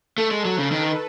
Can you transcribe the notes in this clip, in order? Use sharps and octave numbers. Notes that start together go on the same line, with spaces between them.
A3 A4
G#3
F#3
C#3
D#3 B4